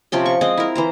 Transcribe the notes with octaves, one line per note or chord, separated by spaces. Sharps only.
C3 F3 C#4 G5
C#6
G#3 C4 D#5
E4 A#4
E3 C5 A#5